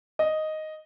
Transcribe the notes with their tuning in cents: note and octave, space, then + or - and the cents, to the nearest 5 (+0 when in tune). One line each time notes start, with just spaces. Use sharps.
D#5 +0